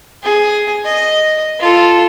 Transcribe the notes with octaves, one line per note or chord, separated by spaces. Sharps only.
G#4
D#5
F4 A4